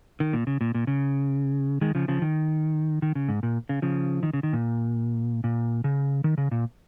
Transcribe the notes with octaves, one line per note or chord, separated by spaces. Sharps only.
D#3
A#2
C#3
A#2
A#2
C#3
D#3 G#3
C#3 F3
C#3 F3
D#3
D#3
C#3
G#2
A#2
C#3
C#3 F3
D#3
C#3
D#3
A#2
A#2
C#3
D#3
C#3
A#2